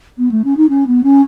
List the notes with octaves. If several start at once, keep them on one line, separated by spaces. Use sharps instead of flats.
B3
A3
C#4
D#4
C#4
B3
C#4